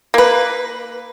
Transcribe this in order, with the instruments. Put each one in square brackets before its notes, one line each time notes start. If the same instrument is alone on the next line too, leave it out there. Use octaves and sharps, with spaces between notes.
[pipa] A#3 B4